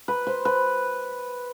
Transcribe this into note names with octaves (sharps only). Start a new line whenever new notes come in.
B4
C5
B4